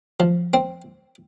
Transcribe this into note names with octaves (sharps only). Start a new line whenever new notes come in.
F3
C4